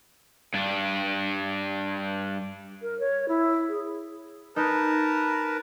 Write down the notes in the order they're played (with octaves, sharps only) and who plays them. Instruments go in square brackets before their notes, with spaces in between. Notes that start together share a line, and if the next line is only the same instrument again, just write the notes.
[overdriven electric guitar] G2 D4
[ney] A#4
C#5
E4
G#4
[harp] D#4 [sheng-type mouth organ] A#4 B4 A5